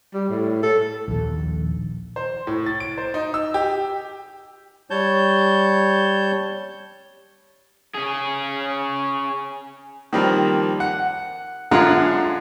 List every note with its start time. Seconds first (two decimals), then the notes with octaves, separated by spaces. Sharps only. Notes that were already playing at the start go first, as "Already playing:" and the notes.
0.14 G3
0.29 A2
0.63 A4
1.08 A#1 D#2
2.16 C5
2.47 A2
2.66 A6
2.80 D7
2.98 C5
3.14 D#4
3.34 E6
3.54 G4
4.90 G3 C#5 A5 G6
7.95 C#4 G#4
10.13 D#3 F3 G3 A#3 C4
10.80 F#5
11.71 F#2 D3 G#3 F4 F#5 A#5